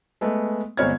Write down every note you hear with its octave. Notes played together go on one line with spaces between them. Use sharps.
G#3 A3 B3
G1 G#3 C4 C#5 F6 G#6